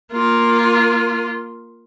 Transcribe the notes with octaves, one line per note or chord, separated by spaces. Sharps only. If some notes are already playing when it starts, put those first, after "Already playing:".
A#3 F4